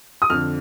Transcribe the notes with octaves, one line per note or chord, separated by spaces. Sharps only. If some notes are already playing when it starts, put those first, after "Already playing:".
D#6
F2 D3 F6